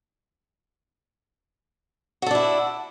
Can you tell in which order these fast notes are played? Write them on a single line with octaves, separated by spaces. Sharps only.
F#4 A4 D4 E4